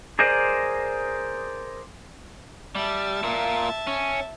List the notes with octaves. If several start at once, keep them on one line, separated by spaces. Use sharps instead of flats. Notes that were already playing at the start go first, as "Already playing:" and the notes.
G#4 A#4 C5 D5 D#5
G3 E5 A5
A#2 A#3
C#4